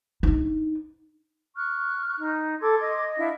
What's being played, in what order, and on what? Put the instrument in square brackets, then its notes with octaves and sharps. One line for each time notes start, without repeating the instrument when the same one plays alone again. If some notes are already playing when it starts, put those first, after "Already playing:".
[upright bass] D4 D#4
[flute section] C#6 F6 F#6
[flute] D#4
[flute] A4 [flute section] C6 D6 G#6
[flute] D#5
[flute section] D4 E4 F5